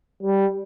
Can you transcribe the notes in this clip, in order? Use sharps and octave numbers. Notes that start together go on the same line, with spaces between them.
G3